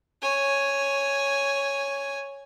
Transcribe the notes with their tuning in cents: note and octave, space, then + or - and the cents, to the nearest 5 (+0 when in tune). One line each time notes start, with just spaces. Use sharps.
C#5 +0 G#5 +0